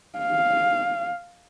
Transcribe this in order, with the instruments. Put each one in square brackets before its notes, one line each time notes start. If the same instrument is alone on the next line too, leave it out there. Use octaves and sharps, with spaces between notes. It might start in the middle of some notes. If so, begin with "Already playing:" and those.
[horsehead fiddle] F5